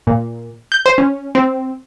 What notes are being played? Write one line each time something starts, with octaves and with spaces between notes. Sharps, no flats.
A#2
G6
C5
C#4
C4